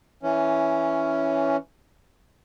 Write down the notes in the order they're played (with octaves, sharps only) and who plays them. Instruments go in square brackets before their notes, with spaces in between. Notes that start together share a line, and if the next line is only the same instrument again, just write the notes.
[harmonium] E3 C#4